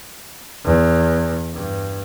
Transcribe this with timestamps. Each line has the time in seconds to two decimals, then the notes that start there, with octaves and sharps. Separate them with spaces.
0.64 E2
1.54 G2